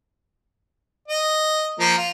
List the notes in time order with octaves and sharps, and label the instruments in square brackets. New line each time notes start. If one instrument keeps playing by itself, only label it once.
[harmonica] D#5
F3 A#3
F4